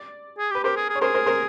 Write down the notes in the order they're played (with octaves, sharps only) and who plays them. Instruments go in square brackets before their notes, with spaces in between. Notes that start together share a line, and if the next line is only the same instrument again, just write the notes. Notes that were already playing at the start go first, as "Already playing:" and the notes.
Already playing: [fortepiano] D5
[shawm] G#4
G4
[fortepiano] B4
[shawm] G4 [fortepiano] A#4 C5
[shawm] G#4
G#4
[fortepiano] C#5
[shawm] G#4 [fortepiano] A#4 C5
[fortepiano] A#4 C5
A#4 C5